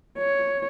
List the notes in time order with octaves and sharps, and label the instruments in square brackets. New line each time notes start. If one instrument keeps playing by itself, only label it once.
[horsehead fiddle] C#5